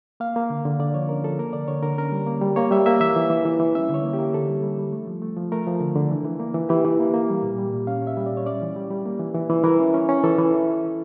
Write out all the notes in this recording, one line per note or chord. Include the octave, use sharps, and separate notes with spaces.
A#3 F5
A#3
D3
D3
D3 D5
F3 C#5
C#4 A#4
F3 A4
A#3 A#4
D3 D5
D3 C#5
D3 A#4
C#4 A#4
G3
A#3
G3
A#3 C#5
G3 E5
A#3 E5
E3 E5
E3
E3
E3
E3
C#4 E5
D3 C#5
A#3
G4
A#3
D3 A4
G3
G3
G3
A3
F3
A3
F3
A3 A#4
F3
D3
D3
E3
E3
A#3
E3
E3 G4
E3
A#3
A#3
G3
A#2
G3
A#2
C#4 F5
C#4
E5
G3
D5
A#2
C#5
C#4 D5
E3
G3
G3
A#3
E3
E3
E3
E3 A#4
C#4
C#4
C#4
E3 A4
E3